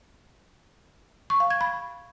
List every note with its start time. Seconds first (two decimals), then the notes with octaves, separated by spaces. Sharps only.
1.30 C#6
1.40 F5
1.50 G#6
1.61 B5